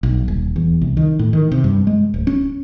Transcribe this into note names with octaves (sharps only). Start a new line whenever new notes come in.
B1
D#1
E2
C2
D#3
A2
D#3
C3
G2
G#3
D1
C#4